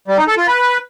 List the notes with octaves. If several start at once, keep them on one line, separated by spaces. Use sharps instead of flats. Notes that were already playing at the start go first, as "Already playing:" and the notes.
G3
D#4
A4
F4
B4